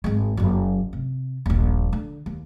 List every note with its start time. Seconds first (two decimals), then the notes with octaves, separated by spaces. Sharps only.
0.04 G#1 G#3
0.37 F#1 F#3
0.93 C3
1.46 D#1 A#1
1.93 D3
2.26 D#2